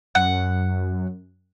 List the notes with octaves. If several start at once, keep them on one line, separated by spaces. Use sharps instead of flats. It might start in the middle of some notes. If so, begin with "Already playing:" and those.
F#2 F#5